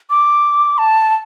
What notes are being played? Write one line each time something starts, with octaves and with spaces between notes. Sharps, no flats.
D6
A5